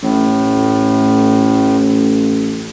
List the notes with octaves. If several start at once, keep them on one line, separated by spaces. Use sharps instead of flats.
A1 A2